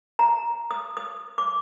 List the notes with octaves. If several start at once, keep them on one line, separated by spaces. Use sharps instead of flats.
A#5
D#6
D#6
D6